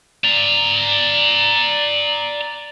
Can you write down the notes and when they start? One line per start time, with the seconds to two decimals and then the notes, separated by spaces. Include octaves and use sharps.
0.24 D5 A#5